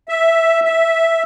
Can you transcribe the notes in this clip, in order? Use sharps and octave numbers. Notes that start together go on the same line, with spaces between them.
E5
E5